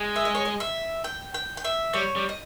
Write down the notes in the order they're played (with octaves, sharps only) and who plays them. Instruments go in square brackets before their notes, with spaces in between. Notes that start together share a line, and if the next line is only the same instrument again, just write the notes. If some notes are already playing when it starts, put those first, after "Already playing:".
Already playing: [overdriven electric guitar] G#3
[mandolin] E5
D#5
C#5
D#5
E5
G5
G5
G5
E5
[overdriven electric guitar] G3 [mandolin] C#5
[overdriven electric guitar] G3
[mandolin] D#5